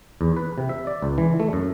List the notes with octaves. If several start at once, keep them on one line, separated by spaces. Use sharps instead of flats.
E2
B4
C3
E5
D5
C#2
E3
A3
F#2